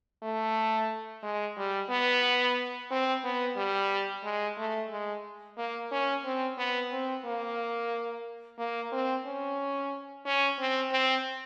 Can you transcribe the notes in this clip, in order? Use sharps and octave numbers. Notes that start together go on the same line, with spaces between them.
A3
G#3
G3
B3
C4
B3
G3
G#3
A3
G#3
A#3
C#4
C4
B3
C4
A#3
A#3
C4
C#4
C#4
C4
C4